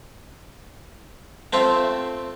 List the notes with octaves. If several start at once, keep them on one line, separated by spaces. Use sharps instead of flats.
A3 C4 F4